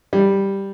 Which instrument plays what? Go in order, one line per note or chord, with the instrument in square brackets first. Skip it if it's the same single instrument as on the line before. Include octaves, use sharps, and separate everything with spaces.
[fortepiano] G3